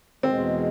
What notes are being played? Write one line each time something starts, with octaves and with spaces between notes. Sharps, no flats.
E2 B2 G#3 C4